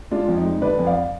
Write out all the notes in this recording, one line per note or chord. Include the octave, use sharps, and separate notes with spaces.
G#3 D4 F4
F2
D#4
G#3
D3 B4 D5
F2
D5 F5